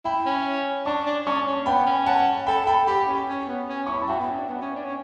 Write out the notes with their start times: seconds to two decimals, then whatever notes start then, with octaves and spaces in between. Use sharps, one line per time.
0.05 E4 G5 B5
0.25 C#4
0.85 D4 A5 C#6
1.05 D4
1.26 C#4 A5 C#6
1.47 C#4
1.66 B3 G5 B5
1.86 C#4
2.06 F#5 A5
2.47 A4 G5 B5
2.67 A4 G5 B5
2.87 G4 G5 B5
3.07 C#4
3.28 C#4
3.48 B3
3.69 C#4
3.86 E4 C#6
3.94 B5
4.02 A5
4.08 F#4 E5 G5
4.18 B3
4.29 C#4
4.38 D4
4.49 B3
4.62 C#4
4.76 D4
4.85 C#4